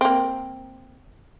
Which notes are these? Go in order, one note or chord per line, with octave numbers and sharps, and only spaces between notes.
A#3 C4